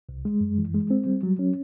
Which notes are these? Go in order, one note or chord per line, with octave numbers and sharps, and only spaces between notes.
C2
G#3
F#2
E3
G#3
C4
G3
F#3
C#4